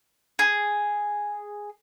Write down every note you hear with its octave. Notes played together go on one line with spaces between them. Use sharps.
G#4